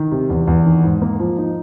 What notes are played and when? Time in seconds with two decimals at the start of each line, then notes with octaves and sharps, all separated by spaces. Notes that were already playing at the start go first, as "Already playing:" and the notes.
Already playing: D#3
0.12 C3
0.30 E2
0.47 E2
0.66 D#3
0.84 G#2
1.02 A#3
1.20 F3
1.38 D#4